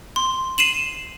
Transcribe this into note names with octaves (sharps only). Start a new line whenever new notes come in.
C6
C7 D#7 E7 F#7